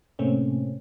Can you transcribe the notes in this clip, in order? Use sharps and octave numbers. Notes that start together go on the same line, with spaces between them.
A2 C3 A3 A#3 C4 C#4